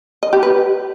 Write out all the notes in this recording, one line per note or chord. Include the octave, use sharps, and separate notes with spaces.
D#5
G4
B4